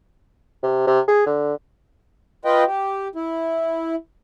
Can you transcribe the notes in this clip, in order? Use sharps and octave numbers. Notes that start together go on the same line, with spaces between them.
C3
C3
G#4
D3
F4 B4 D#5 G5
G4
E4